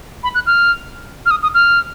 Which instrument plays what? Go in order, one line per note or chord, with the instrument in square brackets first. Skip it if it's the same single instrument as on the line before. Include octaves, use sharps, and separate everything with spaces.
[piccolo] B5
F#6
F6
F6
D#6
D#6
F6